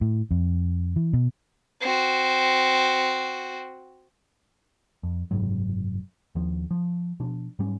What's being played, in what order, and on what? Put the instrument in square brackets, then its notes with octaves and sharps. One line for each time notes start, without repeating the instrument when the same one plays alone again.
[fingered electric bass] A2
F2
E3
B2
[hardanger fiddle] C4 F#4
[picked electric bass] F2
F#1 G#2 C3 F#3
D#2 F3
F3
B2 F3 D4
G#2 F#3 G3 C#4